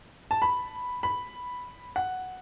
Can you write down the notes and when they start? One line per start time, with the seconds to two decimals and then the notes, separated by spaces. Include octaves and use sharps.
0.31 A5
0.42 B5
1.03 B5
1.96 F#5